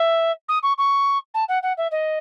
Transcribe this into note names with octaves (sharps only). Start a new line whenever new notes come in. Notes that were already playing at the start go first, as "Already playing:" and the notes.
Already playing: E5
D#6
C#6
C#6
A5
F#5
F#5
E5
D#5